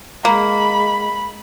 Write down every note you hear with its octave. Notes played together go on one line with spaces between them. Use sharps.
G#3 A#3 B5